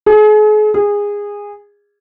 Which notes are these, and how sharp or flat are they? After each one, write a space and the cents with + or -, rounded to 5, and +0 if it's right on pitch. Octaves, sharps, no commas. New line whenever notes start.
G#4 +40
G#4 -20